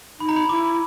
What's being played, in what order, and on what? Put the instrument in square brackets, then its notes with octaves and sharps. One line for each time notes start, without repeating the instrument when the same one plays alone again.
[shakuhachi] D#4 [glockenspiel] B5
[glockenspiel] A#5
B5
[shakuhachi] E4 [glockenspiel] D6